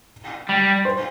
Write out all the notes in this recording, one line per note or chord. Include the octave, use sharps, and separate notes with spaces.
G3
C5